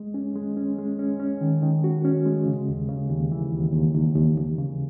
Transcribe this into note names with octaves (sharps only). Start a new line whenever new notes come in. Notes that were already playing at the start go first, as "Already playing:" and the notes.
Already playing: G#3
C#4
G#3
C#4
G#3
C#4
C#4
D#3
D#3
F#4
C#4
G#3
C#3
D#2
C#3
D#2
E3
D#2
D#2
D#2
D#2
D#2
C#3